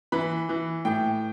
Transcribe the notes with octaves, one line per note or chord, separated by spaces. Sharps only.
E3 B5
E3
A2 G5